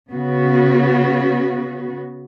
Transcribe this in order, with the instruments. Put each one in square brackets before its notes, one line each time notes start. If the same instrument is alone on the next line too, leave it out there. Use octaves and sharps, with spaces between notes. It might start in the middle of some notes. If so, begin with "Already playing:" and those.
[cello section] C#3 B3 F#4